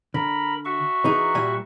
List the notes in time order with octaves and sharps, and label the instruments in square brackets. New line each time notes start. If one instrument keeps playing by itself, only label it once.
[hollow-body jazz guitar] D3 [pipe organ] A#4 B5
[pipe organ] F#4 E5 C#6
[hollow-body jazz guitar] E3 D#4 G#4
A#2 G3 G#5